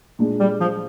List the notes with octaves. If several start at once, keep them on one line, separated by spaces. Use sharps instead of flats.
A#2 G#3 D4
G3
F3